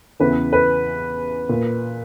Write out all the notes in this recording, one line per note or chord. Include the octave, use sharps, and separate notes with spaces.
E2 C#3 E3 B4
B4
A#2